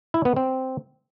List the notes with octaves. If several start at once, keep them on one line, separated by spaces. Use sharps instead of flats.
E4
B3
C4